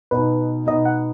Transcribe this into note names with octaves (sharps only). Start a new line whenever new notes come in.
B2 B3 D#4 B4
B2 B3 D#4 D#5
F#5